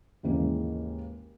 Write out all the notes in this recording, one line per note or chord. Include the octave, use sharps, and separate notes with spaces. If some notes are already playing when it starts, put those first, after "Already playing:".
D#2 G#2 C#3 E3 G#3 A#3